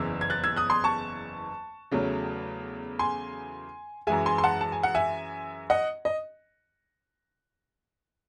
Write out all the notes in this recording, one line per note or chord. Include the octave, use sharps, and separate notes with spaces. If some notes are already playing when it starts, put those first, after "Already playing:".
Already playing: F#1 E2 C#3 E3 E6
G#6
F#6 A6
E6 G#6
D#6 F#6
C6 D#6
A5 C#6
E2 C#3 F#3 A3
G#5 C6
F#2 E3 G#3 E5 G#5
G#5 C6
C6
F#5 A5
A5
G#5
F#5
E5 G#5
D#5 F#5
D#5